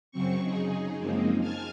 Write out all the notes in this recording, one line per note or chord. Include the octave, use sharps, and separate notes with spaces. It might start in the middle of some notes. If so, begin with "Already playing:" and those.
F#2 C#3 F#3 C4 C#6
C#3 D#4 G#4
F#2 F3 G#3 A#3 C4 D#4
G#5 A5 F6 G#6